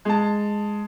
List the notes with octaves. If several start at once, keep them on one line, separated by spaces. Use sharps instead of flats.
G#3 A5